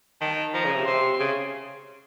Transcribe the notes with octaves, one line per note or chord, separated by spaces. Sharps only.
D#3 A5
F3 A#5
C#3
C3
C3 C6
C#3